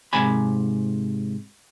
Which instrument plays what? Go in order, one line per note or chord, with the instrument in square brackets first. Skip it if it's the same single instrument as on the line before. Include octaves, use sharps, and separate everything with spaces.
[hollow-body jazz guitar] G#2 C3 G#5 B5